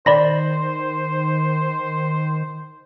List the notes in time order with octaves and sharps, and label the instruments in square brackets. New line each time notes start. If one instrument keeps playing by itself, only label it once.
[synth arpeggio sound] D#3 [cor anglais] C5 [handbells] D5 B5 A#6